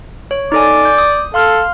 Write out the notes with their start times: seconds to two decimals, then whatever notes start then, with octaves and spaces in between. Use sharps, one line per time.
0.31 C#5
0.52 D#4 A4 D5 G#5
0.85 G6
0.98 D#6
1.34 A4 F5 C6 F6